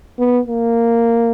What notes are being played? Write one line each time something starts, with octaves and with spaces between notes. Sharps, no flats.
B3
A#3